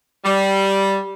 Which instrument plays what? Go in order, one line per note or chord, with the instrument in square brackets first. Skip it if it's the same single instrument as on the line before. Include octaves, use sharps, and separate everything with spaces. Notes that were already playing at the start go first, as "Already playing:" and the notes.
[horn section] G3